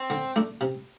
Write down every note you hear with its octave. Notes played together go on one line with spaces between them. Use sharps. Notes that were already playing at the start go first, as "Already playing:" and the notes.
Already playing: C4
D3
A3 D4
C3